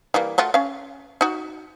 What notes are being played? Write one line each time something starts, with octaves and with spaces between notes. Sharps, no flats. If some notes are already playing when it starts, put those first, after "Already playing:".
E3 G3 A#3
A3 F4 F#4
C#4 F5
D#4 F#4